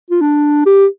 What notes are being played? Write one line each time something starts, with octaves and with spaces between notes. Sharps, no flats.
F4
D4
G4